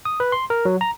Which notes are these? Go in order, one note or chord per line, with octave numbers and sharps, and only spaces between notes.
D#6
B4
C6
A#4
F#3
A#5